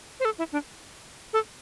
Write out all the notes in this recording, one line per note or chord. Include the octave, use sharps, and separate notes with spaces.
C5
A4
E4
D4
A4